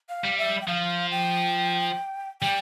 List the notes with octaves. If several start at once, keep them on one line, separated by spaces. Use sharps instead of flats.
F5
G3
E5
G5
F3 F5
G5
G3 G5